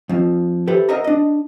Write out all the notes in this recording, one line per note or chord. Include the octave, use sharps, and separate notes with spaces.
F2 F3
G4 A4 B4 C5 E5
A#4 C5 D#5 E5 F#5 A#5
D4 D#5